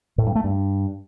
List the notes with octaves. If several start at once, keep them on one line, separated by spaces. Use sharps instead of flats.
A2
G2
A3
G2